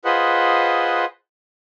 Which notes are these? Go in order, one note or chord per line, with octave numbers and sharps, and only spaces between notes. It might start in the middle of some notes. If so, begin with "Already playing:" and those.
F4 G#4 B4 C5 D#5 F#5